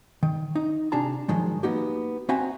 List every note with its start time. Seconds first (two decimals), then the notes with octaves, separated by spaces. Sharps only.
0.23 D#3
0.56 D#4
0.92 C3 D4 F#4 G#4 A5 A#5
1.28 G#2 D#3 F3 F#3 G#3
1.63 A#3 B3 D#4 F#4 G4
2.29 C4 F#4 E5 F#5 G#5 A#5